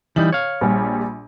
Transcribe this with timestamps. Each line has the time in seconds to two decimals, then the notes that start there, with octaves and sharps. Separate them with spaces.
0.16 E3 G3 D#4 F#7
0.33 C#5 F5
0.61 A#1 G3